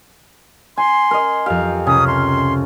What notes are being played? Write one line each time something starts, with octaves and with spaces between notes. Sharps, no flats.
G#5 C6
A#4 D#5
F2 G4 F5
C#2 C3 C#4 D#6
C6